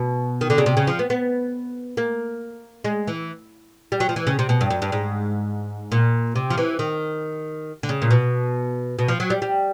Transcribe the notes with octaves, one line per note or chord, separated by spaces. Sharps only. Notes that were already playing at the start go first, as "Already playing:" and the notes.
Already playing: B2
D#3
D3
C#3
C3
C#3
F3
B3
B3
A#3
G#3
E3
G3
F#3
F3
E3
C#3
C3
B2
G2
F#2
G2
G#2
A#2
C3
F3
E3
D#3
D3
C#3
A#2
B2
B2
F3
F#3
G3
G3